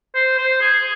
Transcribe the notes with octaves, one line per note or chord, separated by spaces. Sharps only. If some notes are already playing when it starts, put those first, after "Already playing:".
C5
C5
G#4